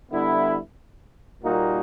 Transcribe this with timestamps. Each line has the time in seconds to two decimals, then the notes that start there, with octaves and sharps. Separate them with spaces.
0.11 D3 G3 B3 E4
1.43 A#2 G3 A#3 D#4 F#4